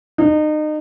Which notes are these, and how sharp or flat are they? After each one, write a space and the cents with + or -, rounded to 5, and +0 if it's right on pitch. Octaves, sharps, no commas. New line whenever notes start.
D#4 -30